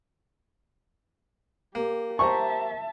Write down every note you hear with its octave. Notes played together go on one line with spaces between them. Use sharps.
A#3 G4
G4 C5 E5 A5 A#5 C#6